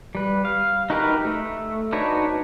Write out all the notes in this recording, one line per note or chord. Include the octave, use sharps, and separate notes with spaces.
G3 B4
F5
D#4 F#4 G4 A#4 B4
A3
D4 D#4 F#4 B4 C#5